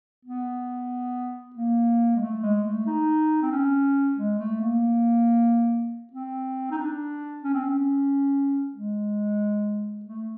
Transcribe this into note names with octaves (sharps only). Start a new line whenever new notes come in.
B3
A#3
G#3
A3
G#3
A3
D#4
C4
C#4
G#3
A3
A#3
C4
D#4
D4
C#4
C4
C#4
G#3
A3